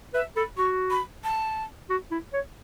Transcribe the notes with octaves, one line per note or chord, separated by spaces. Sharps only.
B4 E5
A4 B5
F#4 C#6
B5
A5
F#4
E4
C#5